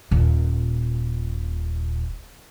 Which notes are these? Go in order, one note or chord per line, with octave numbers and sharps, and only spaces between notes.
D#1 A#2